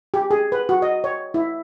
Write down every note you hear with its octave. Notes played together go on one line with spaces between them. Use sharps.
G4
G#4
B4
F#4
D#5
C#5
E4